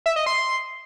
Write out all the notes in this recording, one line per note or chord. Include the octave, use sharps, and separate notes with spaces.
E5
D#5
C6